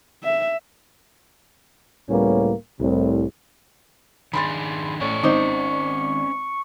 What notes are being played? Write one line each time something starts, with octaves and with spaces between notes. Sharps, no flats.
E5
C#2 A2 G3 A#3 B3 C#4
C2 A2 C3
D#3 D4 G#4 B5 C6 A6
A1 A2 C#4 D5 C#6
G#1 D#4 C5 D6